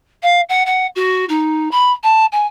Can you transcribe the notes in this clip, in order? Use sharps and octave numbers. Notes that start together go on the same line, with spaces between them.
F5
F#5
F#5
F#4
D#4
B5
A5
G#5